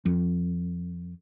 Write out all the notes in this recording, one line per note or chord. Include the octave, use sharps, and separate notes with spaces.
F2